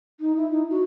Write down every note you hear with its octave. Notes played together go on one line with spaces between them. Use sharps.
D#4
E4
D#4
F#4